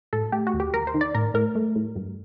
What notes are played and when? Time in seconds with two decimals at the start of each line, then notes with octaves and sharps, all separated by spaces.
0.13 A2 A4
0.32 A3 G4
0.47 F#4
0.54 D#2
0.60 G4
0.74 D#2 A#4
0.87 C5
0.94 D#3
1.01 D5
1.14 A2 A#4
1.34 A2 A#4
1.55 A3
1.76 A2
1.96 G2